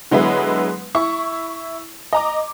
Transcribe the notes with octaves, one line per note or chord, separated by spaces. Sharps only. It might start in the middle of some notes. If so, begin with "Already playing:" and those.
D3 F#3 G#3 B3 E4 B4
E4 C#6
D#5 A#5 D6